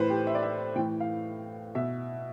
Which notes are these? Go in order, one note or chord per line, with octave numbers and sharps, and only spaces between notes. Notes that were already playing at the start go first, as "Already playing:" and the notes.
Already playing: A2 E3 B4 C5
G4
E5
D5
E5
A2 E3 G5
F5
B2 E5